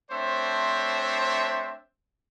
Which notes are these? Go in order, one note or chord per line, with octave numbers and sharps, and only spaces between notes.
A3 C4 D4 C5 C#5 E5